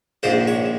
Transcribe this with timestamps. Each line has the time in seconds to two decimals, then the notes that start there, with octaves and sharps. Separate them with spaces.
0.23 A#1 G#2 F3 C5
0.47 C#5